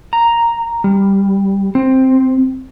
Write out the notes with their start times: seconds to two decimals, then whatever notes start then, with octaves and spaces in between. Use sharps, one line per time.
0.13 A#5
0.84 G3
1.75 C4